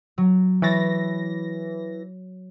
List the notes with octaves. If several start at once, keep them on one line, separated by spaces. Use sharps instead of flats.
F#3
E3 C#5 B5 A6 A#6